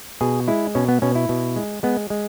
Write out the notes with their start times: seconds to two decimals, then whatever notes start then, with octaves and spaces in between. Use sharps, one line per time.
0.21 B2 G#4
0.48 G#3 E4
0.75 B2 C#4
0.89 B3
1.02 B2 C#4
1.16 E4
1.29 B2
1.56 G#3
1.83 G#3 B3
2.10 G#3